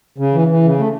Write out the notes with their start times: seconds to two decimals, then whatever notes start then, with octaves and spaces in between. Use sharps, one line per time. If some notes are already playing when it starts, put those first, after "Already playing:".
0.18 C#3
0.33 E3
0.48 E3
0.63 C#3
0.78 A3